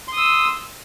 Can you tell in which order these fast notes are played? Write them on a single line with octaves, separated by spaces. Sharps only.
C6 D#6 E6